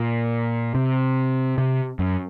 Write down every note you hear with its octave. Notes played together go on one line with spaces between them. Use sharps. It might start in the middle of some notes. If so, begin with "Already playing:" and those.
Already playing: A#2
C3
C3
F#2